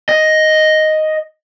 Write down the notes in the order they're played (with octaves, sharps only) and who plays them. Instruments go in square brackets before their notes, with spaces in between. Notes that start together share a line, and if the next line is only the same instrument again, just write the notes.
[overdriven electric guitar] D#5